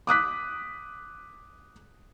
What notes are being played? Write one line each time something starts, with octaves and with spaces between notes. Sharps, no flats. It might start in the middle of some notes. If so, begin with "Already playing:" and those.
D6 D#6 F#6 B6